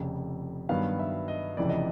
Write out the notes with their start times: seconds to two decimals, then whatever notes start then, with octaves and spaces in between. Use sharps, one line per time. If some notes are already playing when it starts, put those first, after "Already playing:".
Already playing: F1 F2 C#3
0.69 G2 D#3 F#3 B3 F5
0.99 E5
1.28 D#5
1.57 F1 F2 C#3 E3 D5
1.69 D#5